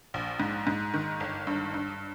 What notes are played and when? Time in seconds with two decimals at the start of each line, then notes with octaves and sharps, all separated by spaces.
0.14 A#1
0.40 G#2
0.67 G#2
0.94 D#3
1.20 G1
1.47 G2
1.74 G2